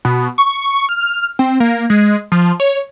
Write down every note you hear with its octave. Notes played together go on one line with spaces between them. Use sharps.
B2
C#6
F6
C4
A#3
G#3
F3
C#5